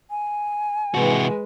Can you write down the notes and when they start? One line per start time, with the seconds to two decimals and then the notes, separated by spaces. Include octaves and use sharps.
0.10 G#5
0.94 C3 E3 G#3 F#4 B4